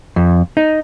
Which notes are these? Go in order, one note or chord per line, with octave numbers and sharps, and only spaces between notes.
F2
D#4